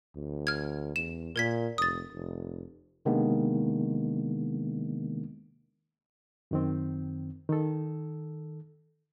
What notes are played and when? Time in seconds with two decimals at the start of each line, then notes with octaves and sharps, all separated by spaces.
0.16 D2
0.47 F6 G#6
0.96 E2 E7
1.36 A#2 A#4 G#6 B6
1.78 F1 D#6 A6
2.12 F1
3.05 C3 D#3 G#3 A#3 B3 D4
6.51 F#2 D#3 C4
7.49 D#3 A4